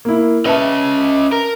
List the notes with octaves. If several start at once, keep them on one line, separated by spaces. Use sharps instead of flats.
A#3 E4
C#4 B4 D#5 E5 A5
A#4